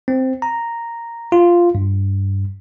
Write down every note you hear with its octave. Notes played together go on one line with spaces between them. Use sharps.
C4
A#5
F4
G2